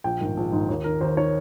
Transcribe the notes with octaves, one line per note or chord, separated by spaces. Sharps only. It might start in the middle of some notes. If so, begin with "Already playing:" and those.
A#1 G5
G#2 D#3
A#1
G#2 D#3
D#2
D#3 A#4
D#2 C5
D#3 C#5